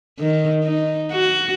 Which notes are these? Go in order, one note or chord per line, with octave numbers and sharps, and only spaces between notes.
D#3
D#4
F#4